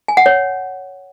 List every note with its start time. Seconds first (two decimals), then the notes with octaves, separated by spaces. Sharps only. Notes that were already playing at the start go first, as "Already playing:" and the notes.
0.08 G#5
0.17 F#5
0.26 C#5